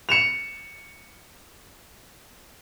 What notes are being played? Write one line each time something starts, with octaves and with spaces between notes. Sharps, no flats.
C#7 E7 F7